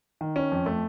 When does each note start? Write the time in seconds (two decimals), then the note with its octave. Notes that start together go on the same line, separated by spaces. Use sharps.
0.21 D#3
0.36 C#4
0.52 F2
0.66 A3